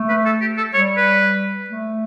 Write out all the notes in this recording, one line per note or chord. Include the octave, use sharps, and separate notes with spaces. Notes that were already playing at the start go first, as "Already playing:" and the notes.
Already playing: A3
B4
A4
G4
A4
G3 C#5
B4
A3